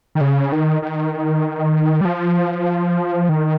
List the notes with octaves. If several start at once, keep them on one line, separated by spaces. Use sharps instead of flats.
D#3
C#3
D#3
D#3
G3
F3
D#3